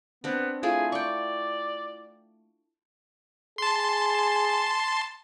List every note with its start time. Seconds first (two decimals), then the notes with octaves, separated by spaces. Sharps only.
0.24 B3 C4 D4
0.63 A3 E4 F4 G#4
0.92 D5 G5 C#6
3.58 G#4 A5 C6